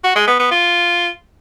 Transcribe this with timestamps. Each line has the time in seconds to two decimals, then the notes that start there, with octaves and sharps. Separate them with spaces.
0.04 F#4
0.16 G#3
0.27 B3
0.39 B3
0.51 F4